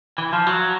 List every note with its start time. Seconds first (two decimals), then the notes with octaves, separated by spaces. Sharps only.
0.18 E3
0.33 F3
0.47 F#3